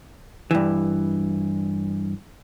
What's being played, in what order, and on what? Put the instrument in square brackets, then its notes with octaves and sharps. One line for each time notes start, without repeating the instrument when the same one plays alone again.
[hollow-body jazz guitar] G2 E3